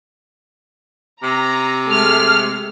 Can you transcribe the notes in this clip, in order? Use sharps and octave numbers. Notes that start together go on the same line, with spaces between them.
C3 A#5
G#3 A3 F6